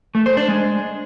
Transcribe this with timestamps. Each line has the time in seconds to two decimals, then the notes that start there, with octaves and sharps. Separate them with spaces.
0.15 A3
0.26 C5
0.37 D4
0.48 G#3